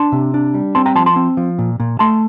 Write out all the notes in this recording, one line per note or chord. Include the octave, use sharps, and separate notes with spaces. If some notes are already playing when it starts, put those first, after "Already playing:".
Already playing: D4 A5 C6
C3
D4
G3
C4 A5 C6
G5 A#5
F3 A5 C6
A5 C6
C4
F3
A#2
A#2
A3 A5 C6